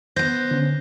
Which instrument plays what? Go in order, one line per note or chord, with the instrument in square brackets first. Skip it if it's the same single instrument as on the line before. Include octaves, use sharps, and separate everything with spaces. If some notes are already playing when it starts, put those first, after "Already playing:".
[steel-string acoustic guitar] B3 C5 [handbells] G6 A#6
[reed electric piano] D3 C#4